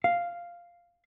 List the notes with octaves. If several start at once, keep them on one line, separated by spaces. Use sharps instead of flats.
F5